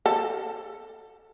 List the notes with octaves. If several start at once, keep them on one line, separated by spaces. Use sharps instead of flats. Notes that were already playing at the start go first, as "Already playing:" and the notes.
A4